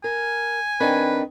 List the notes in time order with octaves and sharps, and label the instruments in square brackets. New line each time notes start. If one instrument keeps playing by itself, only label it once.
[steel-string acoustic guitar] A#4 [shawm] G#5
[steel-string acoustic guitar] D#3 [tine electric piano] C4 D4 [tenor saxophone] B4